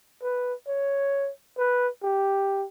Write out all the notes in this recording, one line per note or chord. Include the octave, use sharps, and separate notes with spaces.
B4
C#5
B4
G4